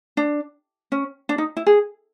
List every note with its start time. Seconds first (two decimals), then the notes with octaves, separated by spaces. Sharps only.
0.17 D4
0.92 C#4
1.29 D4
1.38 D#4
1.57 E4
1.67 G#4